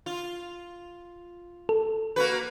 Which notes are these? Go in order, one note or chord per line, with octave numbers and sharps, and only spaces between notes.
F4
A4
A#3 F#4 B4